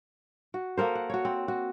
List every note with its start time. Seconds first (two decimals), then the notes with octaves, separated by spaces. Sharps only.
0.54 F#4
0.77 A#3 A4 A#4 C5
0.95 F#5
1.10 F#4 C#5
1.25 C4
1.48 F#4